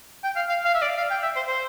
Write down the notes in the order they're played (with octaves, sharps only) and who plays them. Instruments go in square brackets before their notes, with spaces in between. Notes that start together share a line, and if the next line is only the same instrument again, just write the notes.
[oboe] G5
F5
F5
F5
E5
D5
F5
G5
E5
C5
C5